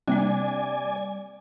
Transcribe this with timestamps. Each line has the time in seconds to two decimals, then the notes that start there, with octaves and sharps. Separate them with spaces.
0.08 C3 G3 A#3 D4 D5 G#5